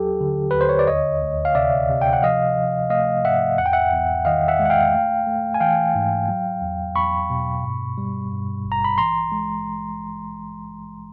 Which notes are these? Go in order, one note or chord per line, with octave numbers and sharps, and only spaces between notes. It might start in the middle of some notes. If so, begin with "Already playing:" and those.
Already playing: D#2 F#3 G4 A4
D3
D#2 B4
C5
C#5
D5
D2 C#5 D#5
D2
F5
C3 D5 E5
C3
G5
F#5
F3 D#5 F5
F3
A3 D#5 F5
G#2 E5 F#5
E2 F#5
G5
E5 F#5
E2
D#3 D#5 F5
E5 F#5
G#3
F#5
F5 G5
A3
A3
G#5
E3 F5 G5
G#2
F#3
E2
E2 B5 C#6
B2
G2
G3
G2
G#1
A#5
B5
E3 A#5 C6
G#3